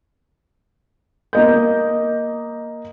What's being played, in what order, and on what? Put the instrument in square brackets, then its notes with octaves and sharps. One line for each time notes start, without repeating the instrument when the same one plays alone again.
[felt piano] A#3 D#5 G6